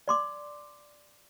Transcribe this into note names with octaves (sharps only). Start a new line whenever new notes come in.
D5 C6 D6